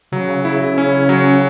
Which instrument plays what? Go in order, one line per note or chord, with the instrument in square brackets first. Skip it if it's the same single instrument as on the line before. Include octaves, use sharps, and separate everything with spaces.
[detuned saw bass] C#3 [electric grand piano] F#3
[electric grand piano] E4
C#4
F#3